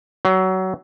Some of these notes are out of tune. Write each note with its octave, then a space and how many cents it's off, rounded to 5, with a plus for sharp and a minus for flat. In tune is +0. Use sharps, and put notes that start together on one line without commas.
F#3 +20